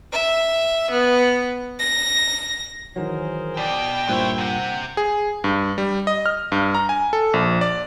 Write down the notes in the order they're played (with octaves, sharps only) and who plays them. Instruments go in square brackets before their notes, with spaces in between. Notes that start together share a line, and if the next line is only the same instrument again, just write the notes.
[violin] E5
B3
A#6
[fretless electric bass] D#3 E3 F#3 [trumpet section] G#4 A#4 C5
[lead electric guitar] B2 [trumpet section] D5 [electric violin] G5
[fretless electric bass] G2 A#2 [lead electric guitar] B3 C#5 [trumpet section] E4 C5
[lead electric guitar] C3 C4 [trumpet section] F#5
[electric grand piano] G#4
G2
G3
D#5
F6
G2
A#5
G#5
A4
A#1
D5